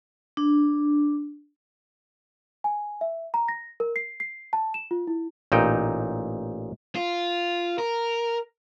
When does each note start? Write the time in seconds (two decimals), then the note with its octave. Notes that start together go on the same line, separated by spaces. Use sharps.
0.37 D4
2.64 G#5
3.01 E5
3.34 A#5
3.48 A#6
3.80 A#4
3.96 C7
4.20 C7
4.53 A5
4.74 E7
4.91 F4
5.07 E4
5.52 A1 A#2 D#4 G5
6.96 F4
7.79 A#4